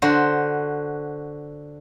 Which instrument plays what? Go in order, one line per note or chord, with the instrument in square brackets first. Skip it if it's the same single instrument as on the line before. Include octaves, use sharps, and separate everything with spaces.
[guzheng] D3 F#4 C5